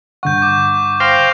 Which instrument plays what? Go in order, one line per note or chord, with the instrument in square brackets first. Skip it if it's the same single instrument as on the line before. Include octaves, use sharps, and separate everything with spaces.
[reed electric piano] G2 D3 F#5 [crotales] C#6 G6
[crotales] D6 G6
[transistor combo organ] C5 F5 G5 [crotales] G6 A#6 C7